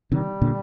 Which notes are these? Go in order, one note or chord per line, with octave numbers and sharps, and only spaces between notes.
C3 D#3 G3
A#2 D3